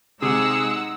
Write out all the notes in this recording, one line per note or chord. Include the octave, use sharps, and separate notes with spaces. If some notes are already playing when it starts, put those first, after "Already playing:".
C3 G#3 D#4 G#4 F#5 E6